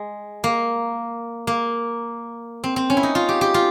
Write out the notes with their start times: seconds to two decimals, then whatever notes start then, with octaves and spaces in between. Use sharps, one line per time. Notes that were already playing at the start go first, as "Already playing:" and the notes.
Already playing: G#3
0.44 A#3
1.47 A#3
2.64 C4
2.76 C4
2.90 C#4
2.97 E4
3.03 D#4
3.15 F4
3.29 G4
3.41 G4
3.54 F4